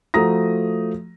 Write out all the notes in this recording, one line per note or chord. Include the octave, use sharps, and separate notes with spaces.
F3 A3 F#4 A#5 D#6 A#6